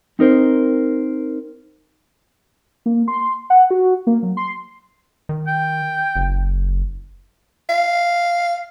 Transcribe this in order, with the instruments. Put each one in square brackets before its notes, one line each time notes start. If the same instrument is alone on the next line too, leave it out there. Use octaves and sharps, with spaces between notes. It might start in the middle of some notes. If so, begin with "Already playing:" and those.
[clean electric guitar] C4 D#4 A#4 C5
[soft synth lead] A#3
C6
F#5
F#4
A#3
F#3
C6
[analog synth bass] D#3
[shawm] G5
[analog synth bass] F#1
[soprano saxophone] F5